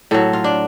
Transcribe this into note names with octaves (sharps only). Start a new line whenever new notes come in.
A2 F#3 A4
F4
D4